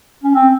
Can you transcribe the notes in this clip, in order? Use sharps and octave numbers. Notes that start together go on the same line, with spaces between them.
C#4
C4